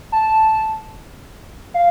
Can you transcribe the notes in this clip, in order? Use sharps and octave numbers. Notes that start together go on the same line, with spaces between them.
A5
F5